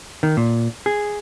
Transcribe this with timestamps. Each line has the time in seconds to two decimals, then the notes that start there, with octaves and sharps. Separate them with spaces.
0.23 D#3
0.37 A#2
0.86 G#4